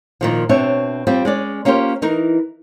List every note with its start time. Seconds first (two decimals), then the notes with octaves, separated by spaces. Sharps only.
0.21 A#2 D#3 F3
0.49 B2 C4 D4 C#5 E5
1.07 G3 C4 F4 G4
1.25 G#3 C#4 D5
1.65 A#3 C#4 F4 G4 C5
2.02 E3 D#4 A#4